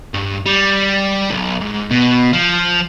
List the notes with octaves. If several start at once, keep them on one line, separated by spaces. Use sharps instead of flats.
G2
G3
B1
G#2
B2
F3